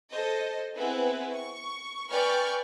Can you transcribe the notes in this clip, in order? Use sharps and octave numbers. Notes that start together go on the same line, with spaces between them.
A4 C5 D#5
B3 C4 E4 G#4 B4
C#6
B4 D5 G5 G#5 C#6 F6